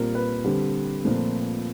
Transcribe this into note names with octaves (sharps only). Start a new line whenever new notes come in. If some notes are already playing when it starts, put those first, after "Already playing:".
Already playing: A#2 G3 C4 A#4
B4
D3 G3 C4
A#2 F3 A3 C4